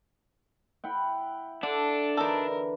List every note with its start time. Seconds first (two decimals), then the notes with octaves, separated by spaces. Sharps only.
0.84 E4 F#5 G5
1.63 D3 D4 A4
2.17 D3 E3 D#4 A4 A#4